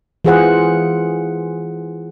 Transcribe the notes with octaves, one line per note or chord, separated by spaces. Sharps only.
E3 F4 G#4 C5 F#5